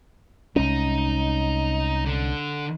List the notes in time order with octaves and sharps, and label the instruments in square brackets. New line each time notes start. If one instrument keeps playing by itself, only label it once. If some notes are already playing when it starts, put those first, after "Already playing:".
[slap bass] C2 G#3 C#4 [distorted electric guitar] D#4
[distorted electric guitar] D3